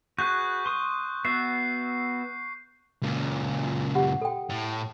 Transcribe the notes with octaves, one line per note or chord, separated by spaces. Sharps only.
F#4 G#4 B4 C#6 F#6 G6
C6 D#6
B3 F#4 E5 C7
C#2 A#2
G4 F#5
A4 G5
A2